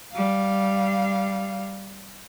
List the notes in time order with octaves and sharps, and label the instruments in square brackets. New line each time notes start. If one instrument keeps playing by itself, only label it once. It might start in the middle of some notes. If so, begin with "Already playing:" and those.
[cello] G3 F5